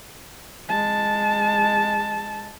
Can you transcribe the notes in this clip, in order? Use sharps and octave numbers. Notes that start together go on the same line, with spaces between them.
G#3 A5